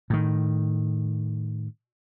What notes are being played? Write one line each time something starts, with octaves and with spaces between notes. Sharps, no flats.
A2 D#3